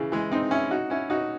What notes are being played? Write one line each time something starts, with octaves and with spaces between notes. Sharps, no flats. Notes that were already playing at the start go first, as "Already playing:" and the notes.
Already playing: C#3 E3
E3 G#3
C4 D#4
C#4 E4
D#4 F#4
C#4 E4
D#4 F#4